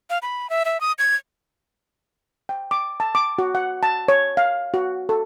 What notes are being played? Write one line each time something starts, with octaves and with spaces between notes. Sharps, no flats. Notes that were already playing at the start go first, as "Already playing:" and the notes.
F5
B5
E5
E5
D#6
G#6
G5
D6
A5
D6
F#4
F#5
A5
C#5
F5
F#4
A4